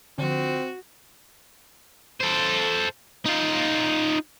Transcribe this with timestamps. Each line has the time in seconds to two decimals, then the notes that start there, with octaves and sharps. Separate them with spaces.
0.18 D3 F3 C4 F#4
2.21 A4 C5
3.26 D#4 F4